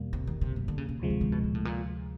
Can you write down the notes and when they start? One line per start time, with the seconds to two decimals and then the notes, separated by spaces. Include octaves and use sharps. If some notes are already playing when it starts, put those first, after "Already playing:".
Already playing: E2 B2 G3 A#3
0.13 C3
0.27 D#3
0.41 C3
0.56 F#2
0.68 D3
0.78 C#3
0.89 C#3
0.99 D2 C3 F3 G#3
1.10 D#3
1.21 D#3
1.32 B2
1.44 A#2
1.55 A2
1.65 A#2